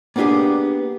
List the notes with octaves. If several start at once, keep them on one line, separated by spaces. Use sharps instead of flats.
A#3 B3 D4 F4 G4 G#4